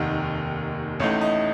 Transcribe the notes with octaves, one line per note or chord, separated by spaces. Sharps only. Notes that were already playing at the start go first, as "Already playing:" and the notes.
Already playing: F1 D#2 D#3 A#3 D#4 F#5
A1 A2 A3 D#4 C#5
D#5